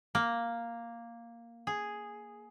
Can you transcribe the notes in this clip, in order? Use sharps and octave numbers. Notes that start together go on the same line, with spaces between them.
A#3
G#4